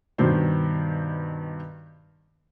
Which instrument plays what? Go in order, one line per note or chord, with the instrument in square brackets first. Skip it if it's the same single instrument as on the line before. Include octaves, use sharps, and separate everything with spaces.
[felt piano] G2 B2 D#3 C5